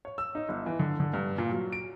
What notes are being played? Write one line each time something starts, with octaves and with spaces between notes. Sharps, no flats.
C#5
E6
D#4
G1
E3
D3
D3
G2
A#2
F#3
D7